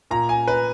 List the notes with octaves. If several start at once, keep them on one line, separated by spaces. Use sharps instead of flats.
A#2 A#5
G#5
B4